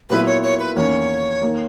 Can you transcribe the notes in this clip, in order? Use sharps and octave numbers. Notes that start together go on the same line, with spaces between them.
A#2 F#3 B3 E4 B4
C#5
C#5
B4
E2 D#3 A#3 C#4 C#5
D#3 A#3